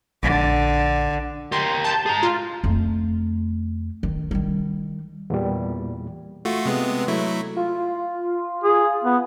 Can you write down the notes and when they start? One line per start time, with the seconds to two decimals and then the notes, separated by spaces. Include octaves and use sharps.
0.23 A#1 D3
1.52 G4 A#4 C6
1.84 A5 G6
2.06 G#4 A#5
2.23 F4
2.64 F2 A3
4.03 D#3
4.31 D#3 G3
5.30 E2 A#2 G3
6.45 A3 F4 F#4
6.65 C3 G#3 B3
7.08 F#3 A3 E4
7.57 F4
8.64 G#4
9.04 B3